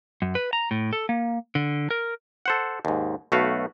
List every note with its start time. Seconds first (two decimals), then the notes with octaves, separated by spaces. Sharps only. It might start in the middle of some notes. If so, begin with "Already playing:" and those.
0.22 F#2
0.35 B4
0.53 A#5
0.71 A2
0.93 A4
1.09 A#3
1.55 D3
1.90 A#4
2.46 A4 C5 F#5
2.85 D#2 G#2
3.32 B1 A3 F#4 B4 F5